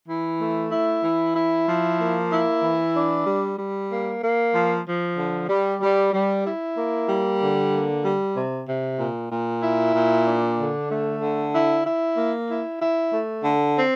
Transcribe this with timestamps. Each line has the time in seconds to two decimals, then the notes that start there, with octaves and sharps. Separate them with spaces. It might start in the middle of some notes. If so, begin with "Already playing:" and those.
0.09 E3
0.40 A3
0.72 E4
1.03 E3
1.36 E4
1.68 F3
2.00 A#3
2.32 E4
2.63 E3
2.94 D4
3.26 G3
3.58 G3
3.90 A#3
4.22 A#3
4.54 F3
4.86 F3
5.18 D3
5.49 G3
5.81 G3
6.13 G3
6.45 E4
6.76 A#3
7.09 G3
7.40 D3
7.72 A#3
8.03 G3
8.36 C3
8.68 C3
8.99 A#2
9.31 A#2
9.63 E4
9.94 A#2
10.27 D4
10.58 D3
10.90 A3
11.22 D3
11.54 E4
11.85 E4
12.17 A#3
12.49 E4
12.81 E4
13.13 A3
13.44 D3
13.76 C4